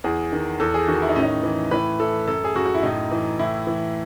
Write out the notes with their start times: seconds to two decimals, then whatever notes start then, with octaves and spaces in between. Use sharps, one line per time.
0.04 E2 G#4
0.32 D#3
0.60 E2 A4
0.74 G#4
0.88 D#3 F#4
1.02 E4
1.09 D#4
1.16 A2 C#4
1.23 D#4
1.43 E3
1.71 A2 B4
2.00 E3 A4
2.27 F#2 A4
2.44 G#4
2.55 F#2 F#4
2.66 F#4
2.74 E4
2.83 A2 D#4
3.11 E3
3.39 A2 E4
3.67 E3